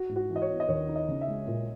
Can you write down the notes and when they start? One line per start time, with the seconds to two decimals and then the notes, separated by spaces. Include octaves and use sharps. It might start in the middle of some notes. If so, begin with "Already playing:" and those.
Already playing: F#4
0.09 G#2
0.16 F#4
0.30 E3
0.36 D#5
0.42 C#5
0.49 B3
0.60 D#5
0.68 D#2 C#5
0.89 D#4
0.96 D#5
1.08 C#3
1.21 E5
1.28 G#3
1.47 A#2